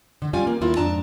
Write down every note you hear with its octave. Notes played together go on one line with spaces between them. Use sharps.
D3
G3 C#4 F4 F5 G#5
A#3
D#2 A#3 E4 F4
F2 G#2 D4 A5 A#5